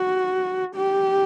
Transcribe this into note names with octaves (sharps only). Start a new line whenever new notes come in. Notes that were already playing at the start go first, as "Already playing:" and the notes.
Already playing: F#4
G4